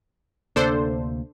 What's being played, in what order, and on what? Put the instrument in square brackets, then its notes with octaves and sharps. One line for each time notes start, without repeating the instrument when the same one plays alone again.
[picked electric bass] D2 C3 A#3 [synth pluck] D4 A4 C5